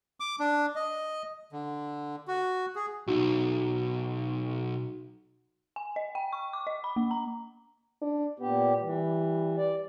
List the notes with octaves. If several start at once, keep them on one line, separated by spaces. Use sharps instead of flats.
D6
D4
D#5
D3
F#4
G#4
B1 D#4 F#4
G#5
D#5
G5
C#6
D6
D#5
B5
A#3
A#5
D4
A#2 B3 G4
E3 G3
D5